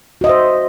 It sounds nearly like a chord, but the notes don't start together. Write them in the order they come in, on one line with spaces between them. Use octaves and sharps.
F#4 D#5 E5 C5